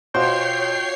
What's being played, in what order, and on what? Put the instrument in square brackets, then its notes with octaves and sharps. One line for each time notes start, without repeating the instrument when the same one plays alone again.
[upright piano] B2 C5 [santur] F4 F#4 D6 [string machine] C#5 C7 [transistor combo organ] G5